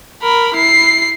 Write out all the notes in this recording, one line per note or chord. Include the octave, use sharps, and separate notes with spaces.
A#4 B5
E4 C7